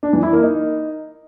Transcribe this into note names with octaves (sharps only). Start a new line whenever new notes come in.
D4
E3
E4
A#3
D#4